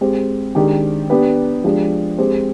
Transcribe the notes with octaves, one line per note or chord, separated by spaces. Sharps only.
G#3 C4 G4 C5
D#3 G#3 D4 G4
B3 D4 G4 B4
F3 G#3 D4 G4
G#3 C4 G4 C5